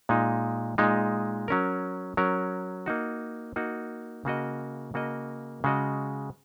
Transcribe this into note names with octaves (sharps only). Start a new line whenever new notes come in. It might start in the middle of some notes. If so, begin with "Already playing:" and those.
A#2 G#3 D#4
A#2 G#3 D#4
F#3 C#4 A#4
F#3 C#4 A#4
A#3 D#4 F#4
A#3 D#4 F#4
C#3 A#3 F#4 D#5
C#3 A#3 F#4 D#5
C#3 G#3 F#4 D#5